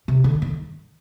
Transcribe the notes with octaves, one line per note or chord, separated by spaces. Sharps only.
C3
D3
D#3